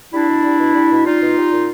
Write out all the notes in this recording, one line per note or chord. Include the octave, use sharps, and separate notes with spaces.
G3 D4 E4
B2
G3
B2
G3
B2
G3 D#4 F4
B2
G3
A#2